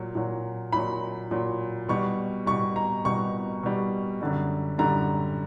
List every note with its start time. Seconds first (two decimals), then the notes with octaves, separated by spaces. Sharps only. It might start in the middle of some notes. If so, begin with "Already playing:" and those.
Already playing: A#2 F#3
0.15 A#2 F#3
0.72 A#2 F#3 B5
1.31 A#2 F#3
1.88 B2 G3 C#6
2.46 B2 G3 C#6
2.76 A#5
3.05 B2 G3 C#6
3.63 B2 G3
4.21 F#2 D3 G3
4.78 F#2 D3 G3 A#5